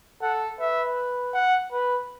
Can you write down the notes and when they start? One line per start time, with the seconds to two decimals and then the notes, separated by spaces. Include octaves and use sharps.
0.22 A4 F#5
0.59 B4 E5
1.34 F#5
1.72 B4